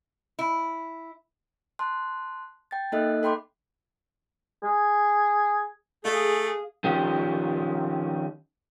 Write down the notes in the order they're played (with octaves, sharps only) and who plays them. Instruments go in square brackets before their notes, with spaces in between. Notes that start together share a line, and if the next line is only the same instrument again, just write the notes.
[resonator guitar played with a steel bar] E4
[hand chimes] A5 C6 F#6
G5 A6
A#3 D#4 A4 D#5 E5 F#6
A4 G5 B5 C6 D6
[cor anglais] G#4
[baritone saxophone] A3 [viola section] G#4 [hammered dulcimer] F5
[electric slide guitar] D#3 F3 C#4 G4